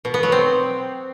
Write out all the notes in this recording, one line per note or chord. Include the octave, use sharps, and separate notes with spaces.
B2
B3
F#3
C4